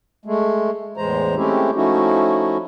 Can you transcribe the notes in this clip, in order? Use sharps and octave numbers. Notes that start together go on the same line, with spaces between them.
G#3 A3
E2 A2 E3 G#3 C5 A#5
G#3 A3 C4 C#4 E4 G4
F3 A3 C#4 D#4 E4 F#4